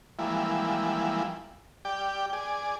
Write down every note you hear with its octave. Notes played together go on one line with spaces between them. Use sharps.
E3 F3 G3 G#3 A#3 E4
G4 D5 G5
G#4 D5